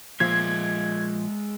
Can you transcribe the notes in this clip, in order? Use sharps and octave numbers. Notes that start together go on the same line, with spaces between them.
A#2 F3 G#3 E5 G#6